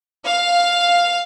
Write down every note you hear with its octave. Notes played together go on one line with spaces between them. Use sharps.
F5